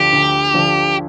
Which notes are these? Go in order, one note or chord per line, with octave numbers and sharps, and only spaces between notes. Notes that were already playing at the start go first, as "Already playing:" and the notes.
Already playing: D2 D3 F3 G4
D2
D3 F3